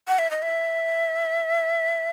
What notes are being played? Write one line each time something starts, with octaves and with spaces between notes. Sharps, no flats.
F#5
E5
D#5
E5